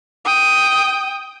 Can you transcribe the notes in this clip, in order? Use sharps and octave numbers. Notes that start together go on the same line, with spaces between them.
G5 D#6